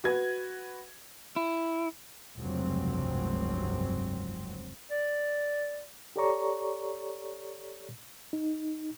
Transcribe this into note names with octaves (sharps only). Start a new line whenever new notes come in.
F#4 B4 G#6
E4
F1 C#2 G2 F#3 C4
D5
G4 A4 C#5 D5 A#5 C#6
D#4